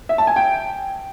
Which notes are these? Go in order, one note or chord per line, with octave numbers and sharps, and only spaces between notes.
E5
A5
G#5
G5